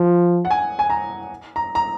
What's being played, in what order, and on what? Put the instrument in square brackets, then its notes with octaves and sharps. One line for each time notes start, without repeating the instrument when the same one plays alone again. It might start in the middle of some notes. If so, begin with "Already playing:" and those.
Already playing: [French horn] F3
[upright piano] F#5
G#5
G#5
A#5
A#5
A#5